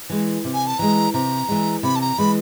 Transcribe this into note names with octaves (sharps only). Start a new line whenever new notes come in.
E3 G#3
C3
G#5
A5
E3 G#3 A#5
C3 A#5
E3 G#3
C3 B5
A5
A#5
E3 G#3 B5